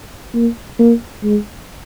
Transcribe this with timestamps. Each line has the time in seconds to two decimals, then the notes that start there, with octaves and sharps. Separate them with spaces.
0.34 A#3
0.79 A#3
1.23 G#3